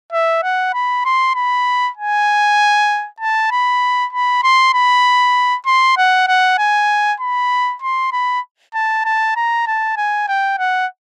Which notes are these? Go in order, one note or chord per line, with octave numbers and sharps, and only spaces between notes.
E5
F#5
B5
C6
B5
G#5
A5
B5
B5
C6
B5
C6
F#5
F#5
G#5
B5
C6
B5
A5
A5
A#5
A5
G#5
G5
F#5